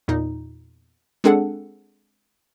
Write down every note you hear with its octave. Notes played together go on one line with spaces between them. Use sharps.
E2 A#2 D#4
G#3 C4 D4 G#4 A4 F#5